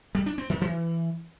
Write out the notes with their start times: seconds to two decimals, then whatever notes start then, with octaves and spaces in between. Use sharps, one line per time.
0.15 G3
0.26 D4
0.38 C4
0.50 D#3
0.61 E3